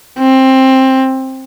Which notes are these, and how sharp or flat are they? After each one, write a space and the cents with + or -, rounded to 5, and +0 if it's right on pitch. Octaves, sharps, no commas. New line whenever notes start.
C4 +15